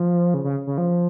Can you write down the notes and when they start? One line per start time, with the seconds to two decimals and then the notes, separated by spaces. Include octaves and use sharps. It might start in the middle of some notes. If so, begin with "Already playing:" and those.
Already playing: F3
0.34 C#3
0.44 C#3
0.67 C#3
0.78 F3